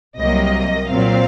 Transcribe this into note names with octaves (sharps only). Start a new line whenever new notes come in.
C2 C3 F#3 A#3 D#5
A#2 F#3 C4 F5